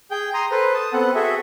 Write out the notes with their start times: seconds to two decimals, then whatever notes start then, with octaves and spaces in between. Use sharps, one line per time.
0.11 G#4 G5 G6
0.34 A#5 C6 D#6
0.51 A4 B4 C5
0.74 A5 D#6
0.93 B3 C4 A4 F#5
1.15 F#4 G#4 A4 E5